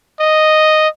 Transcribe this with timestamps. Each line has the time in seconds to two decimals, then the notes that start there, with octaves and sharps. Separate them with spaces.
0.20 D#5